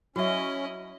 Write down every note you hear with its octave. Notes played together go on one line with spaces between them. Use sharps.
F#3 C#4 E4 F#4 D#5 E5